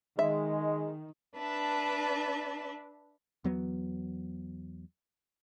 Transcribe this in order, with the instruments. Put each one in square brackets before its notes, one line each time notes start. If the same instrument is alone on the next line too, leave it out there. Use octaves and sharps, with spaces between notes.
[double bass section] D#3 [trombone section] G#3 [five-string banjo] E5
[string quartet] D4 B4 E5 A5
[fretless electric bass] E2 F#3 B3